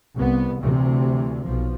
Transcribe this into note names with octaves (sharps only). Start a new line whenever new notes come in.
C2 B3
D2 C3 E3
B1 F3